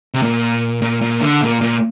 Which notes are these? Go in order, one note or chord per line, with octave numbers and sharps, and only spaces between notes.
C3
A#2
A#2
A#2
D3
A#2
A#2